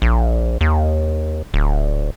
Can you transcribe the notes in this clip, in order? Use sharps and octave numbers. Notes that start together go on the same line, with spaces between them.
A#1
D#2
D1